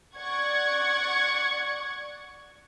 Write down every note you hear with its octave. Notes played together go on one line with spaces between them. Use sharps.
D5 F#5 C#6 G#6